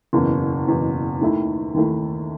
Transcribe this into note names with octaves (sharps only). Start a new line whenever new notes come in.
F#1 E2 B2
F#1 E2 B2
D#2 D#3 A3 E4
D#2 D#3 A3 E4